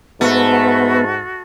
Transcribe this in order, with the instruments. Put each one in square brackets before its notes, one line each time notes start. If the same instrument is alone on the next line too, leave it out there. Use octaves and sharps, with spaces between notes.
[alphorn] G#2 [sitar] A3 [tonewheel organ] B3 [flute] F#4